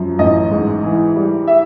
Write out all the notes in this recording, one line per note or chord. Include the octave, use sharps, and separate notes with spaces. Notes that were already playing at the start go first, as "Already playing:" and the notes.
Already playing: F#2 F3
A1 D#5
G#2
E3
G3
E5